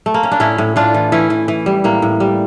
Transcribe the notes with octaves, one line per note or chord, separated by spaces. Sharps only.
A3
A#3
C#4
D4
A2 C#4 E4
A2
A2 D4 F4
E3
E3 C#4 E4
E3
E3
G3
A2 A#3
A2
G3